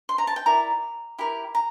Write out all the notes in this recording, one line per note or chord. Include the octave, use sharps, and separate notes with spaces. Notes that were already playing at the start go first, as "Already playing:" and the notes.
C6
A#5
A5
G5
E4 A#4 D5 A#5
E4 G4 A#4
A#5